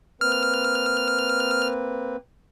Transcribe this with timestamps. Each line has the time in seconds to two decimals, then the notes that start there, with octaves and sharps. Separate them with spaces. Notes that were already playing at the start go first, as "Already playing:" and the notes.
0.21 A#3 C4 B4 F6